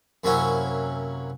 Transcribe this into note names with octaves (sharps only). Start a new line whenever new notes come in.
F#2 C3 F#3 A#3 C#4 E4